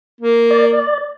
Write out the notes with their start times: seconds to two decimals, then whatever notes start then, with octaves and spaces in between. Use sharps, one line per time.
0.21 A#3
0.51 D5